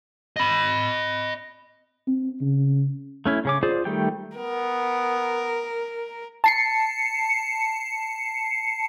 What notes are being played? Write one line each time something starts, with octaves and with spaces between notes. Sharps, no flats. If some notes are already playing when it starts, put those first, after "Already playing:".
D#5 B5
C4
C#3
A3 C#4 E4
C#3 C#4 D6
F4 G#4 C5 D5
D#3 G3 A3 G4 G5
B3 A#4
A5 C7 C#7